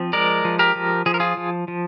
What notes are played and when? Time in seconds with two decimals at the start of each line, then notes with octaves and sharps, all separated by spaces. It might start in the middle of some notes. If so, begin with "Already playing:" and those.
Already playing: F3 C4
0.13 G#3 A#4 D5
0.45 F3
0.59 G4 A#4
0.75 F3
1.06 F3 G#4
1.14 A#4
1.20 F4 G#4
1.37 F3
1.68 F3